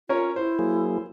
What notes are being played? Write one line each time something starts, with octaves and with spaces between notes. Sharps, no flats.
C#4 F4 A#4 C#5
E4 C5
F#3 A#3 G#4